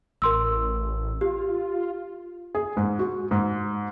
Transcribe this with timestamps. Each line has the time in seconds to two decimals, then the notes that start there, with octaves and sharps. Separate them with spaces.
0.22 A1 A#4 C6 E6
1.21 F4 G4
2.55 G#4
2.77 G#2
2.99 F#4
3.31 G#2